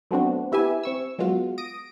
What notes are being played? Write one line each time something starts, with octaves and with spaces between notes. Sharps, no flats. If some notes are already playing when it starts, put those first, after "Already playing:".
F#3 A3 B3 C4 D4 F#4
B3 E4 G4 E5 G#5
C4 C#6 E6
F#3 G#3 B3 F4 F#4
D#6 A#6 D7 D#7